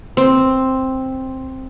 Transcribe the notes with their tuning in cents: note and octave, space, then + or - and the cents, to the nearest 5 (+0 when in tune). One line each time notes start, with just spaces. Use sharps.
C4 +5